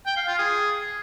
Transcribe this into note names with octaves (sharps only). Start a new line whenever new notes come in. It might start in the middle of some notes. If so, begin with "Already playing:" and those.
G5
F5
F4
G#4